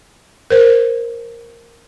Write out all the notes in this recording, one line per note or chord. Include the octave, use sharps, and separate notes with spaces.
A#4 C5